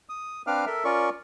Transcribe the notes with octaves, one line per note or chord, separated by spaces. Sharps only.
D#6
C4 D4 B4 F5 D6 F6
A4 A#4 E5
C#4 F4 A#4 D5 C#6